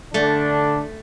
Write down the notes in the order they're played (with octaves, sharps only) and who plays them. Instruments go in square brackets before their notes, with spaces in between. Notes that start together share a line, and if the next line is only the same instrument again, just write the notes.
[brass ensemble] D3 D4 [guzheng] A3